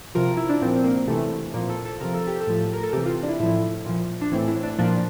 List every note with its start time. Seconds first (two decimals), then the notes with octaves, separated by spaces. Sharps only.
0.15 C3 F3 A#4
0.37 E4
0.49 D4
0.62 A#2 C4
0.65 F3
0.76 C4
0.84 A#3
1.07 C3 E3 A3
1.54 A#2 F3 A#3
1.69 A4
1.85 A4
2.00 C3 F3 A#4
2.14 A4
2.27 G4
2.41 A4
2.47 A2 F3
2.73 A#4
2.83 A4
2.93 C3 E3 G4
3.05 F4
3.23 D4
3.28 E4
3.40 A2 F3 E4
3.86 A#2 F3
4.21 D4
4.32 A2 E3 C4
4.48 E4
4.63 D4
4.78 A#2 F3 D4